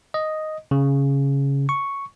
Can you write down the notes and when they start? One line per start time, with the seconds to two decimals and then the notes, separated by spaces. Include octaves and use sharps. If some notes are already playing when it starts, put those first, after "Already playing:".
0.14 D#5
0.71 C#3
1.69 C#6